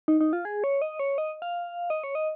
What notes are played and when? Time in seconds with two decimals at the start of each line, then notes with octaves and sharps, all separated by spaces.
0.08 D#4
0.21 D#4
0.33 F4
0.45 G#4
0.64 C#5
0.82 D#5
0.99 C#5
1.18 D#5
1.42 F5
1.90 D#5
2.04 C#5
2.15 D#5